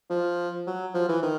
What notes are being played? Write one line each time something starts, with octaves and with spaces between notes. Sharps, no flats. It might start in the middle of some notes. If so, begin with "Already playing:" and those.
F3
F#3
F3
E3
D#3